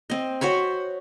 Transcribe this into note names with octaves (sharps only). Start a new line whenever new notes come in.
C4 D#5
F#4 C5 C#5 B5